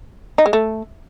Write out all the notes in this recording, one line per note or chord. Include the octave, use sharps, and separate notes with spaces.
D#4
G#3
A3